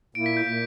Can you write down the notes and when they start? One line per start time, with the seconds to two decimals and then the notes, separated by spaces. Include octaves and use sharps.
0.15 A#2 A#3 E4 D7
0.26 B6
0.37 G6
0.47 A#2 A#3